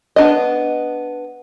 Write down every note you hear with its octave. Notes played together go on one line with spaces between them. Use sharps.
B3 D4 D#5